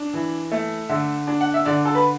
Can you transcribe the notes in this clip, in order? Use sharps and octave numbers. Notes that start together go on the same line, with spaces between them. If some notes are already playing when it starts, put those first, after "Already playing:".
Already playing: D4
E3
A3
D3 E5
D4
F#5
E5
D3 D5
A4
B4